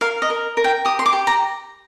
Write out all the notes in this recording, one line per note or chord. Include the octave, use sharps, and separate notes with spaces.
A#4 F5
D#5
A#4
A#4
G5
G4 D#6
C6
D6
G4
A#5